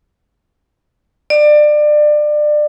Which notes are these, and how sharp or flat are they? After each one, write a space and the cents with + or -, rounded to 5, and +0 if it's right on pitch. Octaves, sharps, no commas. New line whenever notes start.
D5 +25